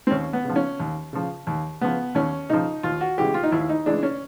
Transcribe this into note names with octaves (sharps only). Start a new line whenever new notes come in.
C4
D#2 C#4
B3
C#3 F3
C#4
D#2
C#3 F3
D#2
C#3 F3 B3
D#2 C#4
C#3 F3 D#4
D#2 F4
F#4
C#3 E3 G#3 G4
F4
D#4
D#2 E4
D#4
C#3 E3 G#3 D4
C#4